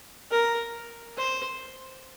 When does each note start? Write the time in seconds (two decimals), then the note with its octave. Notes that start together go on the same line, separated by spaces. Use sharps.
0.31 A#4
1.17 C5